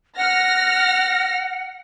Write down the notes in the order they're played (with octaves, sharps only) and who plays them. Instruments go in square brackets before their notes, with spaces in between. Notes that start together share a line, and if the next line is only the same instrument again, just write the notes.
[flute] F#5 [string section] F6 A#6